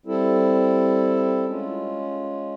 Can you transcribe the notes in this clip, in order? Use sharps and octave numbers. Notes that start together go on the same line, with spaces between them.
G3 C4 E4 A4
G#3 C#4 F4